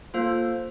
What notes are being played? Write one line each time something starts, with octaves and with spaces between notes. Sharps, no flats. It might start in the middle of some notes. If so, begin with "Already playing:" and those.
A#3 F4 A4 C5